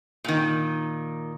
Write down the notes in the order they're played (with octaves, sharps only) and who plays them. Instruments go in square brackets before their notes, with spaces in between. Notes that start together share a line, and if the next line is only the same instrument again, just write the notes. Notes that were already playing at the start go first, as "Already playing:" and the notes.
[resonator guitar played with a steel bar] A#2 D#3